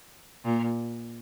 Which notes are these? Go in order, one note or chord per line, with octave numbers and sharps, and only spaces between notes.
A#2